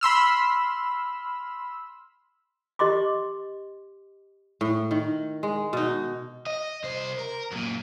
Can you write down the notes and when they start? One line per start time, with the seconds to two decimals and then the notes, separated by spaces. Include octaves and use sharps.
0.01 B5 C6 E6 F6
2.79 G4 D#5 C6 D6
4.61 A2
4.91 D#3
5.43 G#3
5.73 B2 D#4
6.47 D#5
6.84 C2 C5
7.18 A#4
7.52 F#2 A#2